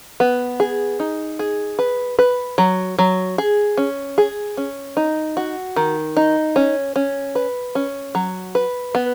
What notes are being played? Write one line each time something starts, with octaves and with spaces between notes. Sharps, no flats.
B3
G#4
D#4
G#4
B4
B4
F#3
F#3
G#4
C#4
G#4
C#4
D#4
F#4
D#3
D#4
C#4
C#4
B4
C#4
F#3
B4
B3